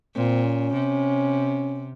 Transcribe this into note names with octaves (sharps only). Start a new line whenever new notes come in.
A#2 C4
C#4
C3